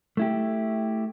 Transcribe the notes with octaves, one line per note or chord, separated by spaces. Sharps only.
A3 E4 G4